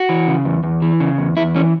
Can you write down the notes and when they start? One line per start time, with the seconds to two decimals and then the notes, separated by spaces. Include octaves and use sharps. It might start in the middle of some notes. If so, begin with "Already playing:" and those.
Already playing: F#4
0.09 E3
0.28 C#3
0.45 E2
0.64 E2
0.82 E3
1.00 C#3
1.18 E2
1.37 E2 E4
1.55 E3 C#4